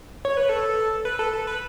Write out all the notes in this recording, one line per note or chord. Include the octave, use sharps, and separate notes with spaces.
C#5
B4
A4
B4
A4
A4
B4